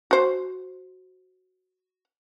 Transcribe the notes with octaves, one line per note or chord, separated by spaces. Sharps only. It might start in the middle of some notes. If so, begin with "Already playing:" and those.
F#4 C5